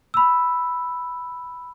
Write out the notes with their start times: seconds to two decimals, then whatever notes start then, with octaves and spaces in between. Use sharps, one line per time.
0.14 B5 E6